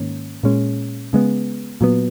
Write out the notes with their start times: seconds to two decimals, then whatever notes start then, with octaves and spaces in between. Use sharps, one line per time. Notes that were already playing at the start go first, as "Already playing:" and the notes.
Already playing: G#2 D#3 A#3 C#4
0.43 A#2 G#3 C#4
1.13 C#3 G#3 B3
1.81 A#2 F#3 B3